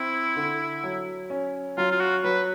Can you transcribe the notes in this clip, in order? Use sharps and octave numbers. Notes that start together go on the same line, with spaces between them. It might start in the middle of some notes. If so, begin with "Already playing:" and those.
Already playing: C4 E4
D3
F#3
C#4
F#3 F4
F4
F#4
F#3 B4